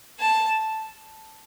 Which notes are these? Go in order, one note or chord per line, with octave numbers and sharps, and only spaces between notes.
A5